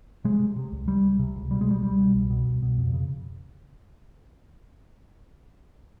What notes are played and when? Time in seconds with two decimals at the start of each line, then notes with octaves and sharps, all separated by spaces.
0.24 C3 G#3
0.40 C3
0.56 C3
0.72 C#2
0.88 C3 G3
1.04 C#2
1.19 C3
1.36 C#2
1.51 B2 G3
1.61 G#3
1.67 C2 G3
1.83 C2 G3
1.99 B2
2.15 C2
2.30 B2
2.46 C2
2.62 B2
2.77 F2
2.93 C#3